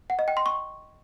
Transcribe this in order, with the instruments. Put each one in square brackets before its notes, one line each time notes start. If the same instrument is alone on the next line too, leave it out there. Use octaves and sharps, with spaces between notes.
[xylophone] F#5
D#5
G5
C6
C#6